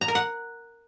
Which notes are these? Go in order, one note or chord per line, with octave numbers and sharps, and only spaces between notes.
A#5
A#4
F#5